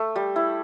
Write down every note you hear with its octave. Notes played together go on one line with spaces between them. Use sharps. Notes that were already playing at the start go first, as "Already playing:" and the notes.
Already playing: A3
G3
E4